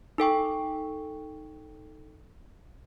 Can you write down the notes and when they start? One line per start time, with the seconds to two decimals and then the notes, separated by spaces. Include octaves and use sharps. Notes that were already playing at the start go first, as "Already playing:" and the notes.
0.18 D#4 A4 G5 C#6